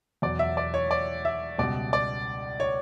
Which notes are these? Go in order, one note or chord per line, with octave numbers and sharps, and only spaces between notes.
E2 B2 F#3 D5
E5
D5
C#5
D5
E5
C#2 B2 G3 D5
D5
C#5